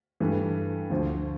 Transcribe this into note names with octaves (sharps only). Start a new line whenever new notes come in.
G2 E3 A3
D2 D3 F3